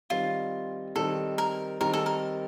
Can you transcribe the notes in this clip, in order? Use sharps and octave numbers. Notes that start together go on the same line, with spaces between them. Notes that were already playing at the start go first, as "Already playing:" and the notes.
D#3 G3 C4 F4
D#3 G3 C4 A4
A#4
D#3 G3 C4 A#4
A4
A#4